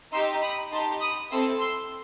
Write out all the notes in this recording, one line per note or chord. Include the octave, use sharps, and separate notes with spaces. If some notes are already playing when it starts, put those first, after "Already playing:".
D#4 G4 C6 E6
B5 D#6
D#4 G4 A5 C6
B5 D#6
C4 E4 A4 C6 E6
C6 E6